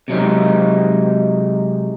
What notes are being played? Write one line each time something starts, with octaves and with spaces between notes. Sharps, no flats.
C3 F#3 G#3 D#4